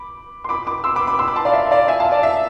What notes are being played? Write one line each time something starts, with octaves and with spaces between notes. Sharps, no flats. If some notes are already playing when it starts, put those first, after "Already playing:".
Already playing: B5 D6
C6
B5 D6
B5 D6
C6 E6
B5 D6
B5 D6
C6 E6
B5 D6
A5 C6
D5 F5
E5
D5 F5
E5 G#5
F5 A5
D5
E5